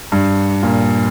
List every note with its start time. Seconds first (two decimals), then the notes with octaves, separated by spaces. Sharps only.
0.12 G2
0.63 A#2